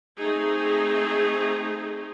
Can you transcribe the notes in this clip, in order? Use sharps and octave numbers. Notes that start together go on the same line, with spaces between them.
A3 C4 D#4 G#4